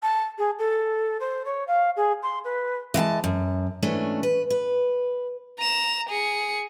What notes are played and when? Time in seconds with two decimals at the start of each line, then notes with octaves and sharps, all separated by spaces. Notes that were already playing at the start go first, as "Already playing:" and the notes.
0.02 A5
0.38 G#4
0.58 A4
1.20 C5
1.45 C#5
1.67 F5
1.96 G#4
2.22 C6
2.44 B4
2.94 E3 G#3 F5 A5
3.24 F#2
3.82 G#2 E3 A3 C#4 D4
4.23 B4
4.50 B4
5.58 A#5 E7
6.09 G#4 C#7